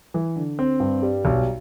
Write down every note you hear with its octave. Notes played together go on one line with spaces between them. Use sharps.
E3
D3
C4
G2
G3
B1